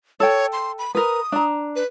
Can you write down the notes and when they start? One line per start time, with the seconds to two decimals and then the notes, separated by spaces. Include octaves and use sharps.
0.20 A4 C#5 G5
0.53 C6
0.79 B5
0.95 A#4 B4 D#6
1.32 D4 A#5
1.76 B4